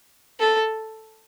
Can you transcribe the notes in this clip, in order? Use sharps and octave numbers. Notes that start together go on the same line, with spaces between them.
A4